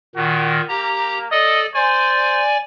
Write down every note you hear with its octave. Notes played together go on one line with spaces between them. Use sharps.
A#2 D#3 F#4
A#3 G4 A#5
A4 D5 D#5
C5 D5 G#5